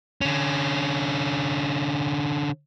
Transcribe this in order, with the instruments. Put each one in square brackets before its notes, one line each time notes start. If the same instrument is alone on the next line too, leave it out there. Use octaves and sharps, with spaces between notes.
[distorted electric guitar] D3 C#4